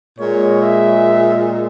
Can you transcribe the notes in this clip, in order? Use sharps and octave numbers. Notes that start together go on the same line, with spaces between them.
A#2 G#3 C#5
E5